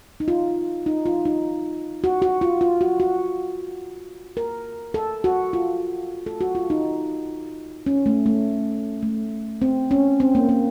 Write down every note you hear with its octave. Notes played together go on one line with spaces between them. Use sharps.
D#4
F4
D#4
F4
D#4
F#4
F#4
F4
F4
F#4
F#4
A#4
A4
F#4
F4
A4
F#4
F4
D#4
C#4
A3
A3
A3
C4
C#4
C4
A#3
A#3